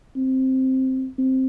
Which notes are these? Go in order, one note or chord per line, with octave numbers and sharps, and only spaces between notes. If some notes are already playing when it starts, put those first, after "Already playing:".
C4
C4